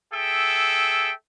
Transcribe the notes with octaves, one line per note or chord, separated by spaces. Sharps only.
G#4 A4 E5 G5